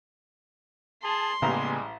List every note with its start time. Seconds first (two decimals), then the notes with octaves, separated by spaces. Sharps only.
1.04 G#4 A5 C6
1.42 A1 C#3 G3 G#3 A#3 B3 G#5 A#5